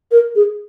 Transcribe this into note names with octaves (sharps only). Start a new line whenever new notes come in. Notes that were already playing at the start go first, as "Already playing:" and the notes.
A#4
G#4